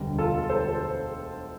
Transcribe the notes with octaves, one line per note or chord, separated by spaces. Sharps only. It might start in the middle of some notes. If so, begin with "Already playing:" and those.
Already playing: E1 D2 D3 G3
F4 A4
A4 C5